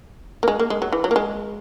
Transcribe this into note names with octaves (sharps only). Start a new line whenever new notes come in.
A#3
G#3
A#3
G#3
F#3
E3
F#3
A#3
G#3